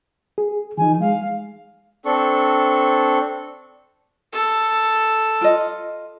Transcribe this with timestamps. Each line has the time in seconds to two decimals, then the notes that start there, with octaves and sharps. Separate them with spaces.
0.38 G#4
0.77 E3 F3 D#4 G#5
1.00 G#3 F5
2.05 C4 D4 A4 C#6
4.32 A4
5.41 F4 D#5